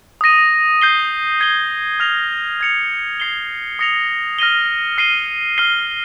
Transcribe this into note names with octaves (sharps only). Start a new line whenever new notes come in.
D#6 A#6 D#7
G6 C7 G7
G#6 C7 G7
F6 A#6 F7
F6 G#6 C#7 F7
G#6 C7 G7
D#6 A#6 C#7 F7
F6 A#6 D#7 G7
F6 C7 D#7 G7
F6 C7 G7